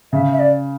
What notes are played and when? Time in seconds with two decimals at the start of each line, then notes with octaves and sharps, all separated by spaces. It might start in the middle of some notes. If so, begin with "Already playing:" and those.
0.13 C#3 E5
0.33 E5
0.39 D5